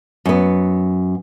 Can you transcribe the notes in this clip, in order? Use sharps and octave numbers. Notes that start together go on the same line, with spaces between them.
F#2 B3